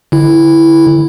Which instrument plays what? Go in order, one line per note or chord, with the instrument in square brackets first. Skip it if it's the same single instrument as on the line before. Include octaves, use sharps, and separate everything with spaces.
[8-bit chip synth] D3 E4